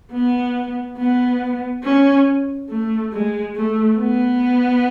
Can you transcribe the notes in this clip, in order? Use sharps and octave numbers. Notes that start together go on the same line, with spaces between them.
B3
B3
C#4
A3
G#3
A3
B3